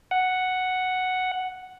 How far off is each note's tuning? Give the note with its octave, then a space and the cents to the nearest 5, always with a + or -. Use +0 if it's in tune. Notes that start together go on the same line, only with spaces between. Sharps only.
F#5 +0